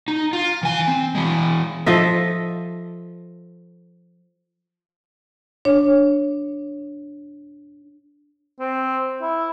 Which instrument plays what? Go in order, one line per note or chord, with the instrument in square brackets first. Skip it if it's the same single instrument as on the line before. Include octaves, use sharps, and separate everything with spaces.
[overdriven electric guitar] D#4
F4
E3 G#5
C4
E3 G#3
[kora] F3 A4 D#5 E5
[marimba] D4 C#5
[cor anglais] C4
E4